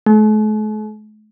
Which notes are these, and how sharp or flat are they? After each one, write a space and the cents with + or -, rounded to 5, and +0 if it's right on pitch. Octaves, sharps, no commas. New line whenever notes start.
A3 -45